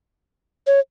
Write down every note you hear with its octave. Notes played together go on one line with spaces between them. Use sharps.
C#5